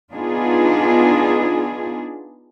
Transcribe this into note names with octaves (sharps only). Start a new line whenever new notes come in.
B3 D4 D#4 F4 G#4